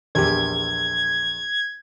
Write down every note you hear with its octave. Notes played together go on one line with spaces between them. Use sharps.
A#1 E2 G4 G#6